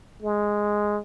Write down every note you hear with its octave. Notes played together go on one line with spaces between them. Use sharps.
G#3